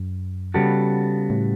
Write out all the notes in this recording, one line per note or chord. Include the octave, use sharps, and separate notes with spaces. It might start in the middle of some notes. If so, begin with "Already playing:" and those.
Already playing: F#2
C#3 G3 B3 F#4 A4
A2